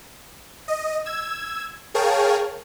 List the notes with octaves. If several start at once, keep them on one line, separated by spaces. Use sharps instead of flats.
D#5
E6 G#6 E7
G#4 A#4 C#5 F5 G5 A5